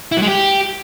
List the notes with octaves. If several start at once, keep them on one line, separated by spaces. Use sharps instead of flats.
E4
F#3
G#3
G4